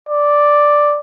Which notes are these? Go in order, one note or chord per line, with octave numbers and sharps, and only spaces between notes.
D5